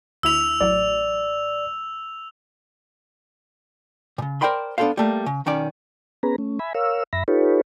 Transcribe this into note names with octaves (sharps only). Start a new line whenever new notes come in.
D2 E4 E6 B6 F7
A1 A2 F#3 D5
A#2 C#3
A#4 C5 D5 G5 B5 C6
B3 D4 F#4 A4 C5 F5
G3 A3 A#3
C#3
B1 D#3 C#4 D5
B3 C#4 G#4 B4 A#5
A3 C#4
E5 G#5 B5
A#4 C#5 F5 E6
F#2 E5 B5 A#6
D#4 F4 G4 A4 B4 C#5